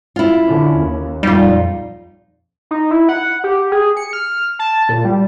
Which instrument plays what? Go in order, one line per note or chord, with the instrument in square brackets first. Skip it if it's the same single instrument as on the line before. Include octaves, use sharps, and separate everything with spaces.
[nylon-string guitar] E4 F4
[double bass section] D3 C#4
D#2
[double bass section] A#1 F2 [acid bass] G3 [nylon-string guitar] D#4 F4
[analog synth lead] D#4
E4
F#5
G4
G#4
C#7
F6
A5
A#2
G3